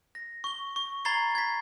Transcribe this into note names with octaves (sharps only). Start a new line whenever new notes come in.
A#6
C#6 G7
C#6
A#5 B5 G#6 A6 C7 G7
G#6 B6